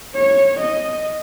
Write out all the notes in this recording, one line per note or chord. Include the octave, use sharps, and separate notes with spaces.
C#5
D#5